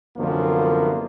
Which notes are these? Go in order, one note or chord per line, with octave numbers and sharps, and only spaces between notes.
C2 F#2 D3 F3 A#3 B3